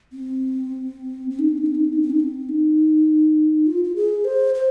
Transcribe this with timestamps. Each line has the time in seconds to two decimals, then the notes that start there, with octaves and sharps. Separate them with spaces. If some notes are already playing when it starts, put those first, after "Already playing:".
0.13 C4
1.30 C4
1.39 D#4
1.49 C4
1.58 D#4
1.66 C4
1.75 D#4
1.85 C4
1.93 D#4
2.02 C4
2.10 D#4
2.20 C4
2.49 D#4
3.67 F4
3.84 F4
3.96 G#4
4.25 C5
4.54 C5